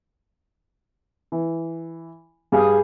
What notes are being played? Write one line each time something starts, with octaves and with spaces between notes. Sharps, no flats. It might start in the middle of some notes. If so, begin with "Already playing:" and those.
E3
G2 G3 G#4 F5